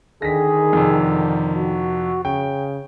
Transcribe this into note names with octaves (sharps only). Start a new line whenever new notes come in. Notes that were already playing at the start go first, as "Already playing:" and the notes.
D3 D#3 G#4 A#6 B6
F2 C3
F#4
C#3 G5